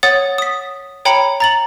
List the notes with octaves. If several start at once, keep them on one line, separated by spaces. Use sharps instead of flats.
C#5 F#5 D#6 A6
D#6 B6
C#5 G5 A#5 B5 C#7
A#5 A6 F#7